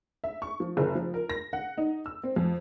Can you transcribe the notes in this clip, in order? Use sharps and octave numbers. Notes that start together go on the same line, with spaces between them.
E5
C#6
F3
F#1
F3
A#4
A#6
F#5
D#4
E6
C4
F2